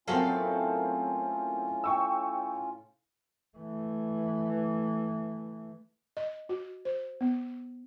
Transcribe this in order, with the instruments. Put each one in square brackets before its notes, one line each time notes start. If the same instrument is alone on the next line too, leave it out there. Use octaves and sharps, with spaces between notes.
[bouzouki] A2 A4 F5 [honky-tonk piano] F#3 A#3 C4 [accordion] C#4 F4
[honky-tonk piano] G5 C#6 E6
[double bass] E3 A3
[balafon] D#5
F#4
C5
B3